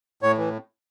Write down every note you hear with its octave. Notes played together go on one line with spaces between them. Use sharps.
A2 C#5
E3